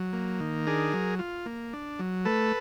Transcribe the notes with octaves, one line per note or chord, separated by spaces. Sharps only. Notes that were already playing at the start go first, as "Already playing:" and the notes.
Already playing: F#3
A#3
D#3
D4 G#4 A#4
F#3
F4
A#3
D4
F#3
A3 A4 B4